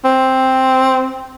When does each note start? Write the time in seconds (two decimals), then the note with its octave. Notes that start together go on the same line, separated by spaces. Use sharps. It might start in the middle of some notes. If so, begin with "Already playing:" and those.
0.05 C4